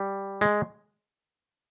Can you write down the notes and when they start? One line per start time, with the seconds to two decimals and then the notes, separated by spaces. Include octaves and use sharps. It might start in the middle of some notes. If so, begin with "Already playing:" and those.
Already playing: G3
0.41 G#3